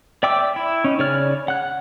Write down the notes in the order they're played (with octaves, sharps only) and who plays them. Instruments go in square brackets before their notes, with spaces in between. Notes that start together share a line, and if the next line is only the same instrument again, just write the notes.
[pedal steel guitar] D5 E5 G5 D6 E6
E4
C#4 D#4
C#3 C#5 D5 F6
F#5 F#6